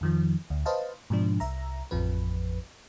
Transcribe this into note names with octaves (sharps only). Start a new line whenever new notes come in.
F2 D#3 F3
D2
B4 C5 D#5 F5 A5
G#2 B2 F3 D4
C2 E5 A#5
A1 F2 F3 B4